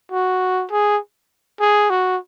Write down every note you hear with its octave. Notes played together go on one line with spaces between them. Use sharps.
F#4
G#4
G#4
F#4